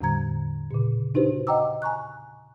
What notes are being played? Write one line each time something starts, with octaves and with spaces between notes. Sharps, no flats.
E2 A2 D3 G3 A#5 G#6
A#2 C#3
D4 D#4 F#4 G4 B4 C5
D#5 F#5 G5 A#5 D6 E6
G#5 A#5 C#6 F#6